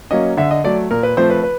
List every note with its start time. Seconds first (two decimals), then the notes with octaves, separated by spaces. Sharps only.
0.11 F#3 A#3 C#4 D#5
0.37 D3 E5
0.51 D#5
0.64 F#3 A3 D5
0.91 A#2 A#4
1.03 B4
1.17 F3 A3 C4 C5
1.30 B4
1.43 B4